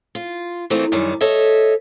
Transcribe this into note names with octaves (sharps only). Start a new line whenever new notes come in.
F4
E3 A3 A#3 C4 D#4 F4
F#2 D#3 G3 G#3
A4 C#5 D#5 E5